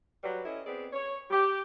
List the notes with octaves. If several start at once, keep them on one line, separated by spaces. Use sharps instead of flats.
F#3 G3 B4
C#4 E4 A4 D#5
B3 C4 G#4 D5
C#5
G4